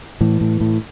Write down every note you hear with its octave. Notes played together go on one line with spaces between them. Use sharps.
A2 E3
A2
A2